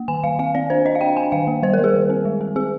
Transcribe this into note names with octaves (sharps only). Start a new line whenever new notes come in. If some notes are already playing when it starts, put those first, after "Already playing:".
Already playing: A#3
D#3 G#5
D#3 F5
C4 F5
C4 D5
D4 C5
D4 D#5
F5
D4 G5
D4 G#5
D#3 F5
A#3
G3 C5
A#4
G3 G#4
D#3
C4
G#3
C4
C4 G#4